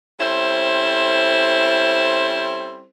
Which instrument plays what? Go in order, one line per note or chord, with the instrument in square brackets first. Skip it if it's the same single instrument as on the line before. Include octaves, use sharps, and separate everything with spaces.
[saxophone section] G3 C4 C#4 E4 A4 C5